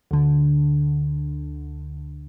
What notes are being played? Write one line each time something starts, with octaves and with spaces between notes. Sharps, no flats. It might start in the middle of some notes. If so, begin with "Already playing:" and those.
D2 D3